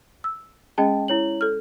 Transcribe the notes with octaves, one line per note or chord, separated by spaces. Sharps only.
E6
G#3 C#4 G#4 D#5 G5 A5
E4 C#5 F#7
A4 F6